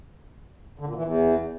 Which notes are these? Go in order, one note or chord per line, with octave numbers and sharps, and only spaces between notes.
D3
A#2
E3
E2